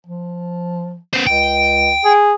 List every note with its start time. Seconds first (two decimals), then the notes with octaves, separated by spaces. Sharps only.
0.07 F3
1.14 B3 C5
1.27 C#2 G5
2.05 G#4